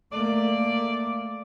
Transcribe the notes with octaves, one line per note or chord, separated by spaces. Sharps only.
A3 A#3 D5